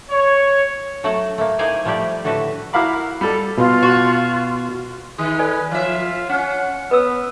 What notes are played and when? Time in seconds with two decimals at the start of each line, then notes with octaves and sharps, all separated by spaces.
0.11 C#5
1.04 F#3 A3 F#4 A4 F#5
1.38 A3 A#3
1.59 D#4 E4 C5 D5 F5 G#5
1.85 F3 G3 A3 G4 D5
2.24 A2 D3 F#4 A4 B4
2.73 E4 F#4 A#4 F5 B5 D6
3.21 G3 A4
3.58 B2 F4
3.83 F#4
5.18 D#3 G#4
5.39 A4 B4 D5 G#5
5.71 F3 F4 E5
6.29 C#4 F#5
6.91 B3 B4 E6